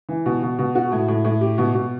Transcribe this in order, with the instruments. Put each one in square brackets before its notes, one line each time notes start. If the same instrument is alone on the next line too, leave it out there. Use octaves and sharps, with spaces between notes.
[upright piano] E3
B2
B2
B2
F#4
A2
A2
A2
G4
B2
B2